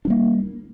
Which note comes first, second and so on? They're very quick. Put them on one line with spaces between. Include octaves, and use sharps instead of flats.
D4 G3 A#3